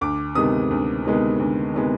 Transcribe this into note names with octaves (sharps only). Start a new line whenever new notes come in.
D2 D6
C3 D#3 G#3 B3 D#6
D2
C3 D#3 G#3 B3
D2
C3 D#3 G#3 B3